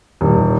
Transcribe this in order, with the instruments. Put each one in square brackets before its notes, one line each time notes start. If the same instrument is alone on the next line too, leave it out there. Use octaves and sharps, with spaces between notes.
[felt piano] D#1